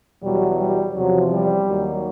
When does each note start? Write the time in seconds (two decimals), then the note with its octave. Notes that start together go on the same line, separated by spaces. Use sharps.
0.22 E2 B2 F#3 G3
0.58 G3
0.95 E2 C3 F3 F#3
1.32 G3
1.68 D#2 D#3 F#3